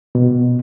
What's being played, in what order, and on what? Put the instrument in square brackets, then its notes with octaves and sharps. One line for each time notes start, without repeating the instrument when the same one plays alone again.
[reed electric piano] B2